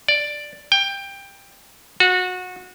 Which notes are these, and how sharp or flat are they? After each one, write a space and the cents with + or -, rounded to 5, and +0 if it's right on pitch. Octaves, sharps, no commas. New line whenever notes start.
D5 +5
G5 +15
F#4 -25